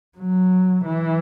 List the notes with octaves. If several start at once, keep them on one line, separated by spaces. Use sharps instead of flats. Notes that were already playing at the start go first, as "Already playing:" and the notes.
F#3
E3